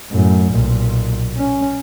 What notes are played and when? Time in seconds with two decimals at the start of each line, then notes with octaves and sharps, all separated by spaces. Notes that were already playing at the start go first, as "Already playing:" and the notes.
0.12 F#2 A2
0.50 B1 A#2
1.36 C#4